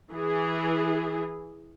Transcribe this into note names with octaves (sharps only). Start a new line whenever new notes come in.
E3 G#4